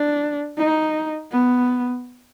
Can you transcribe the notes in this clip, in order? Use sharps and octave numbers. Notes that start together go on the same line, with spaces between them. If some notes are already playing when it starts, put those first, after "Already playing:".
Already playing: D4
D#4
B3